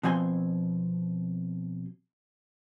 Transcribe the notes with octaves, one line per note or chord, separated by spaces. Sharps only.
B2 F3 C4 G#5 C6